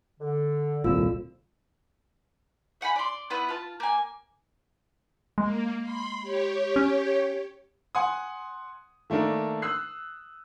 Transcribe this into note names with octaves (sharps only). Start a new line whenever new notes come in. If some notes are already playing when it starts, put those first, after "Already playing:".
D3
D#1 C2 F2 A#2 F3 F4 E6
E5 F#5 G#5 B5
D5 C6
B3 E4 B4 F#5
F4 A5
A#3 G#5
G#3 A#3
B5 C6
G4 C#5
C#4
F#5 G#5 C6 D#6
D#3 A3 A#3 D4 A#4
D#6 E6 F#6 C7